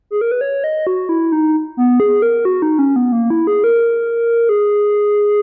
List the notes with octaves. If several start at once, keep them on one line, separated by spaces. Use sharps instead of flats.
G#4
A#4
B4
C#5
D#5
F#4
E4
D#4
B3
G#4
A#4
F#4
D#4
C#4
B3
A#3
E4
G#4
A#4
G#4